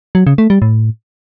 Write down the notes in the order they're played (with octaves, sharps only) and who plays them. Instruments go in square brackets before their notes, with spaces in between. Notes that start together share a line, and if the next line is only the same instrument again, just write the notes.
[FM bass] F#3
C#3
A3
G3
A2